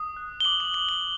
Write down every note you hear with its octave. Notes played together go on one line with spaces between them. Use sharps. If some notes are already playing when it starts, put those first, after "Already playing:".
Already playing: D#6
F#6
G7
D6 F#7
F#7
D6 F#7
G7